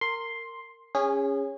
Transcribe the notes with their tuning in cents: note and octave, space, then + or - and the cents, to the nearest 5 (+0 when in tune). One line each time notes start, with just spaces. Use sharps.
A#4 -20 C6 +5
C#4 +0 G#4 -25